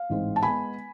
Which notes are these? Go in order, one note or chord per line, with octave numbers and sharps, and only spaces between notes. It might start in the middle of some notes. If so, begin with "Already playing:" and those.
Already playing: F5
A1 G#2 G#3 C4
A5
G#3 B3 G#5 B5